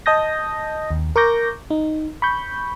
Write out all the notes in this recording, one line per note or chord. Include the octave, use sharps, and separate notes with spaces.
D#5 A5 D#6 G6 A#6
D#2
A#4 C#6 D6 G6 A#6
D#4
B5 C#6 G6